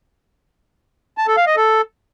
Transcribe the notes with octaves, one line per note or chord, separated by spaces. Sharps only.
A5
A4
F5
D#5
A4